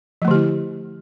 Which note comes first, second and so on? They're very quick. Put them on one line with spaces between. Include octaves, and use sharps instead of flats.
F3 A3 D3 G4 E4